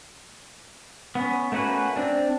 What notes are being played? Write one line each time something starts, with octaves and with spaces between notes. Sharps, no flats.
B3 C#4
A3 A#3 C#4 F#4 B4
C4 D4